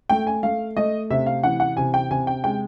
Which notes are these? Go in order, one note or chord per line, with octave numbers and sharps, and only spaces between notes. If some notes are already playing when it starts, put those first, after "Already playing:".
A3 G5
G#5
A3 F5
A3 D#5
C3 E5
F5
E3 F#5
F#5
C3 G#5
G5
C3 G#5
G5
G#3 G5